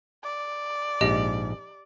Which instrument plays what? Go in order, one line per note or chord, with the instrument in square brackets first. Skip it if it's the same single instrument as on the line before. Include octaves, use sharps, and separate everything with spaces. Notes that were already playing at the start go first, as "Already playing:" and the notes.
[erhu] D5
[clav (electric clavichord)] A#1 G#2 [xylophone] G4 D#5